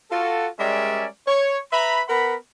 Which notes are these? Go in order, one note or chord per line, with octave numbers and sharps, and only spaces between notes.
F4 F#4 A4
G3 G#3 C#4 A#4 D5 E5
C#5
B4 E5 A#5 B5
B3 A#4 F#5 B5